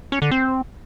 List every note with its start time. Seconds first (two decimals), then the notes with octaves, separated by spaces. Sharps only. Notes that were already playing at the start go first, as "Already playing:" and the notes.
0.12 C#4
0.22 D3
0.31 C4